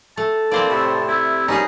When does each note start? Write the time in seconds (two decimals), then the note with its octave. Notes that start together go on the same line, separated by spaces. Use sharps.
0.17 A3 A5
0.51 E3 A#3 C4 C5 D5
0.70 A2 C3
1.08 C3 E4
1.48 G3 A#3 C#4 D#4 G#4 A#5